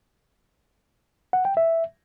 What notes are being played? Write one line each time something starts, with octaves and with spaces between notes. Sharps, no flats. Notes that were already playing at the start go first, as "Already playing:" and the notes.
F#5
G5
E5